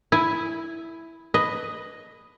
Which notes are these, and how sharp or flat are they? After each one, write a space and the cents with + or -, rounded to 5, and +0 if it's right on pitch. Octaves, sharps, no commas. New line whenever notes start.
E4 +0 G#5 +0
B4 +5 D#5 +0